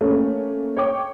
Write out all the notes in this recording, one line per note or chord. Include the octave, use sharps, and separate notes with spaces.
A3 A#3 C#4
C#5 G5 D6